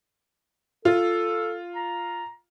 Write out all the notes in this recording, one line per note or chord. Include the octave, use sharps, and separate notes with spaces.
F4 A4
A#5